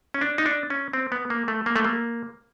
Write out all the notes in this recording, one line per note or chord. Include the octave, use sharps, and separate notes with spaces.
C#4
D4
D#4
D4
C#4
C4
B3
A#3
A3
A#3
A3
A#3